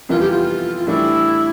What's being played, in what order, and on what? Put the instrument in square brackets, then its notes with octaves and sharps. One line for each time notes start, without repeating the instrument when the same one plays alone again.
[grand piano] F2 C3 E3 G3 B3 [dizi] F4
[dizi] G4
F4
[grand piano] A2 E3 G3 D4 [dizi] E4